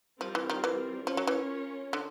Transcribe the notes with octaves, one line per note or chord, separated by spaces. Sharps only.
F3 G3 C4 F4 A#4
E3
D#3
E3
F3 C#4 F4 A#4 C#5
F#3
E3
D3